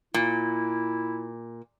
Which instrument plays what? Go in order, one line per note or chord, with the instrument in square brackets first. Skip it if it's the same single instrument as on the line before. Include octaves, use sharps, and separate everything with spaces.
[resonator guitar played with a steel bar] A#2 [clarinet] E4